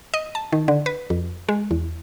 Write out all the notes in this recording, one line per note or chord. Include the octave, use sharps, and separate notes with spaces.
D#5
A5
D#3
D3
B4
F2
G#3
E2